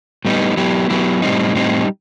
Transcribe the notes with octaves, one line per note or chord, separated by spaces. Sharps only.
A2 G3 B3 D#4
F#3 B3 E4 G4
F#3 B3 E4 G4
A2 G3 C4 D#4
A2 G3 C4 D#4